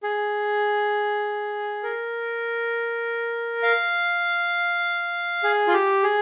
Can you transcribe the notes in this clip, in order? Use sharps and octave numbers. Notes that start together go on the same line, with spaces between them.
G#4
A#4
F5
G#4
F4
G4
G#4